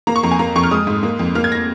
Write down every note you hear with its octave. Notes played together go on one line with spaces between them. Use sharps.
A#3 A#5
C#6
F2 A#5
G#5
A#3 A#5
F2 C#6
F6
G#3 D#6
G#2
A#3
F2
A#3 F6
G#6
A#6